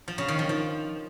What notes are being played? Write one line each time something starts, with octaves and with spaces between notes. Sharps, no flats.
F3
C#3
D#3
F3
F3